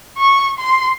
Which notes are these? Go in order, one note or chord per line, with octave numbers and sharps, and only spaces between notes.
C#6
C6